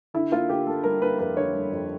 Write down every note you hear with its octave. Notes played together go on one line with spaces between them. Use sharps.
D3 E4
A#3 F4
D3 G4
A#3 A4
G3 A#4
A#3 B4
F2 B4
D3 C#5
G3
F2